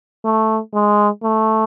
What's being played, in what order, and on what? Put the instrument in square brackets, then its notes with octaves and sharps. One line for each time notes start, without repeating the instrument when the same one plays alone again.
[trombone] A3
G#3
A3